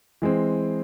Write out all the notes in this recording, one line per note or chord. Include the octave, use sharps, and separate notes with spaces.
E3 G#3 C4